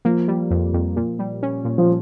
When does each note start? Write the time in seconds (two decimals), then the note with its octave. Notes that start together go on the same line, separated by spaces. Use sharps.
0.05 F3 A#3
0.28 G3
0.51 F2
0.73 F2
0.96 A#2
1.19 G3
1.43 C#4
1.65 A#2
1.78 F3